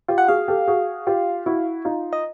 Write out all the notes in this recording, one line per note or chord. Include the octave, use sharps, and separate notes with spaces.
F4 G4
F#5
F#4 G#4 F5
G4 A4
F#4 G#4
F4 G4
E4 F#4
D#4 F4
D#5